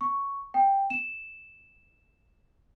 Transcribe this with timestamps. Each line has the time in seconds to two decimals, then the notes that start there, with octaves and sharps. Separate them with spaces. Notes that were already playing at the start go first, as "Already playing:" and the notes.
0.01 C#6
0.54 G5
0.90 E7